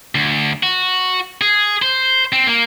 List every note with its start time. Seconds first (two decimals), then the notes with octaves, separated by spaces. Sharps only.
0.15 D2
0.63 F#4
1.41 G#4
1.82 C5
2.32 C4
2.47 A#3